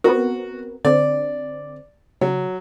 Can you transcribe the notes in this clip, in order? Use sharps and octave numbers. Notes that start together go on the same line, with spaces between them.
B3 C4 F#4 A#4
D3 C4 D5
C#3 F#3